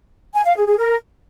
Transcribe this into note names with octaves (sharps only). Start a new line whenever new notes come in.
G#5
F5
G#4
G#4
A#4